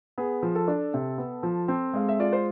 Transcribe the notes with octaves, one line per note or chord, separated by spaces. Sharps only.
B3 G#4
F3
A4
D4
C3
B3
F3
C4
G#3 F5
E5
F4 D5
C5